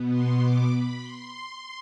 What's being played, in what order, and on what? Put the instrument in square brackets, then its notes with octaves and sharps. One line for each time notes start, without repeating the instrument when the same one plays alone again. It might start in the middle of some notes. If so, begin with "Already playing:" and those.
Already playing: [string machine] B2 B3
C6
D6
B5
C6